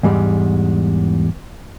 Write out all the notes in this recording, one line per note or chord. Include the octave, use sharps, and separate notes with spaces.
E2 G#2 G3 G#3